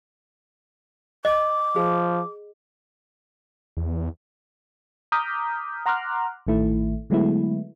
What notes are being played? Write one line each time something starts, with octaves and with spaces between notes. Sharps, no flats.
D#5 D6
F3 G#4
E2
A#5 D6 D#6 F6 G6 B6
F#5 A#5 C6 D6 F6 F#6
A1 D#3 A3 E4
D3 F#3 G#3 A3 B3 E4